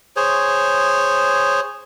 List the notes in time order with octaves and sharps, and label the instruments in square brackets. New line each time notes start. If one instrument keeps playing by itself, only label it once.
[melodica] G#4 C5 C#5